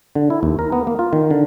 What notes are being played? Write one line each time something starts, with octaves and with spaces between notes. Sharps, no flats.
D3
E4
D#2
A#4
B3
A#3
F4
D#3
D3